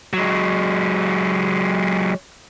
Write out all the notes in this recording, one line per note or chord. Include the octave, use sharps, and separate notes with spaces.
F#3 G#3